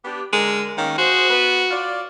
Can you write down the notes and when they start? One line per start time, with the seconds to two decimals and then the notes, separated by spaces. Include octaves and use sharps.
0.05 B3 D4 G4
0.33 D3 G#3 A#4
0.78 D#3 A#3 C#4
0.98 F#4 G#4 C5
1.30 B3 B4
1.71 F4 C#5 D5